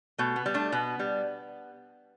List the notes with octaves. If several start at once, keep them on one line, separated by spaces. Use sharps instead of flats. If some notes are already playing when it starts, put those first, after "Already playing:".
B2 A3
B3
G3
A3 D4
B2 B3
G3